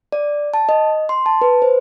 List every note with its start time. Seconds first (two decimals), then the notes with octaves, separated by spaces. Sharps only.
0.12 D5
0.54 A5
0.69 D#5
1.09 C6
1.26 A5
1.41 B4
1.62 C5